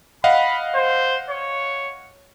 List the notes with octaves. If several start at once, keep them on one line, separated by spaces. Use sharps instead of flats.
D#5 F5 F#5 B5
C5
C#5